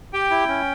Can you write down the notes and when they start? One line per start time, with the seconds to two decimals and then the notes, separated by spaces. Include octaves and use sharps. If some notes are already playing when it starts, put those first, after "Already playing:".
0.13 G4 G5
0.30 E4
0.48 C#4